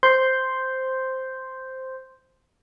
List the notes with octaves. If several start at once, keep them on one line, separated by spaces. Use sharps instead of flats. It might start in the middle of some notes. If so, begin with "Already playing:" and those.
C5 C6 G6